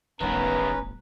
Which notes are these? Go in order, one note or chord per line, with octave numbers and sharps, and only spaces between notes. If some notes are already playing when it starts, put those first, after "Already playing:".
D1 G1 D#3 B3 C#4 B4 A#5